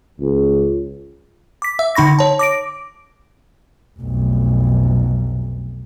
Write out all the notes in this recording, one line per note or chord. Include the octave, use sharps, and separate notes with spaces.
C#2
D6 B6
E5 E6
D3 D#4 B5 C#6 A#6
C#5 A5
D6 A#6 D7
F1 B1